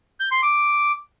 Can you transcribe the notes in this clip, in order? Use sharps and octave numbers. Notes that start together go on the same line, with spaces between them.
G6
C6
D6